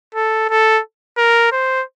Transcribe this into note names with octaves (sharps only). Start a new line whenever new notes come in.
A4
A4
A#4
C5